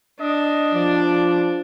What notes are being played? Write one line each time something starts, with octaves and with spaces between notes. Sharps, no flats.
D4 D#5
F3 D5